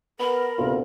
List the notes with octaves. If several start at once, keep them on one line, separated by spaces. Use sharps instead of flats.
B3 A#4 B5
D2 C3 B3 F4